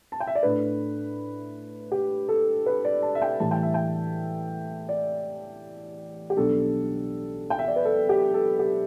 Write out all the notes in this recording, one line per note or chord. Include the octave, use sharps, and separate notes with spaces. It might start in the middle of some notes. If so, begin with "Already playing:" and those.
A5
G5
E5
D5
A2 A3 D4 B4
G4
A4
B4
D5
A5
E5
G5
A2 E3 G3 A5
G5
E5
G5
D5
G4
B1 B2 G3 D4 A4
G5
E5
D5
B4
A4
G4
A4
G4